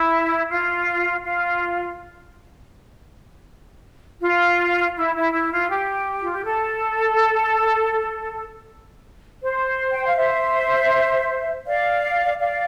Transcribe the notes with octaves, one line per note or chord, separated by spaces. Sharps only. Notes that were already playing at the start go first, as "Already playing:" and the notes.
Already playing: E4
F4
F4
F4
E4
E4
E4
F4
G4
F4
G4
A4
C5
G5
F5
C5 E5
D5 F5
D5 F5